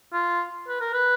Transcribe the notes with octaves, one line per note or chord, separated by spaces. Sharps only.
F4
B4
A#4
B4